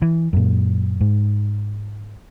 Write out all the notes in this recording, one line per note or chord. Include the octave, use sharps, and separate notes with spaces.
E3
F#2 A#2
G#2